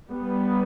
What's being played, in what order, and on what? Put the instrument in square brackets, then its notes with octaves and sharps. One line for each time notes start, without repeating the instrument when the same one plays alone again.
[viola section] G3 B3